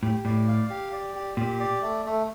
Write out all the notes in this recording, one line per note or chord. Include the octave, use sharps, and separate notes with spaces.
A2 G4
A2 D5
F5
G4
D5
G4
A#2 G4
D5
A3
A3